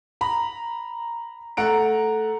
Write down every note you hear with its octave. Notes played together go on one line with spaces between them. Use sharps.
A#5 B5
A3 F#5 A#5 D7